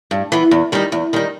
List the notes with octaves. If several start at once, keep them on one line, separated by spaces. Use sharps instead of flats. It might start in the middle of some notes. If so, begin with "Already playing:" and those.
G2
E3 B3
E2
D#3 G3 D#4
E2
D#3 G3 D#4